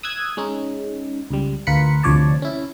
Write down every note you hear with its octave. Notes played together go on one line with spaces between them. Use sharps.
D#6 E6 F#6 G#6
G#3 C#4 D#4
C#2 G3
D2 F4 A#4 B4 B5 C#7
D2 C3 F3 C#5 D5 A5
C#4 E4